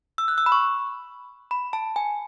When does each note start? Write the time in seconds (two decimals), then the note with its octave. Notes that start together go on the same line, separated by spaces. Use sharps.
0.18 E6
0.28 F#6
0.38 E6
0.46 B5
0.52 C#6
1.51 B5
1.73 A5
1.96 G#5